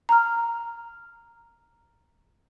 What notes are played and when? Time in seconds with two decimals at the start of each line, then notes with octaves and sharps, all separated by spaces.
0.09 A#5 F6